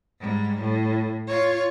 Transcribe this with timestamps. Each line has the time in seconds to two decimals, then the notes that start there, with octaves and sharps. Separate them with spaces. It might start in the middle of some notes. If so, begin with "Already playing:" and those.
0.20 G#2 G3
0.61 A2
1.28 F4 C#5